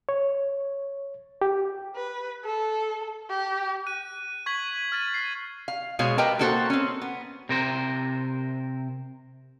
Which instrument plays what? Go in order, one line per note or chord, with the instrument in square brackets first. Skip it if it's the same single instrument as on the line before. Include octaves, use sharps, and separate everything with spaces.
[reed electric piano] C#5
G4
[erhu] B4
A4
G4
[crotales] F#6 D#7
C#6 G#6 B6 F#7
F6 A6 D#7
C7
[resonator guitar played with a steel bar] F5
B2 G#3 G#4 C#5 F5
G4 A#4 B4 D#5 G5 A5
A#3 B3 F#4 A4 A#4 C5
C4 C#4
B3
[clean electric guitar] C3 A#4 C5